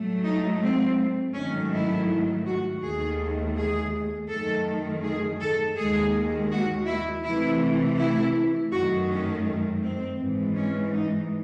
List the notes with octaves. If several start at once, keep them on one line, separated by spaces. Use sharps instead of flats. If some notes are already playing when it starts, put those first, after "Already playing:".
Already playing: A2 F#3 A3
D#4
C4
G#2 D#3 F#3 A3 C#4
E4
F#4
D#2 D#3 A3 G#4
G#4
F#2 D#3 A3 A4
G#4
A4
D#2 D#3 G#3 G#4
F#4
E4
C3 E3 A3 E4
E4
F#2 D#3 A3 F#4
C#4
C4
G#2 E3 G#3
C#4
D#4